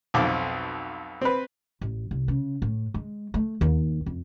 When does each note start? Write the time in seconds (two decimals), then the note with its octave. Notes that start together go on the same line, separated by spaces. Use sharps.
0.14 B1 F2 D6
1.21 C4 B4
1.81 A1
2.11 C2
2.28 C#3
2.62 A2
2.94 G#3
3.34 A3
3.61 D#2
4.06 F2